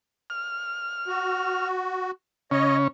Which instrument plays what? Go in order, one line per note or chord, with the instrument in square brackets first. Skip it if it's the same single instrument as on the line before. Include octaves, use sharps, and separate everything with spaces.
[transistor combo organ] F6
[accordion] F#4
[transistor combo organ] C#3 C#4 [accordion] C#5 D#5